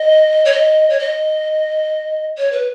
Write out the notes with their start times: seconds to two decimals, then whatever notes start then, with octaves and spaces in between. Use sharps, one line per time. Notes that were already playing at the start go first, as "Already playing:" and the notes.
Already playing: D#5
0.45 C#5
0.52 D#5
0.90 C#5
0.99 D#5
2.38 C#5
2.52 B4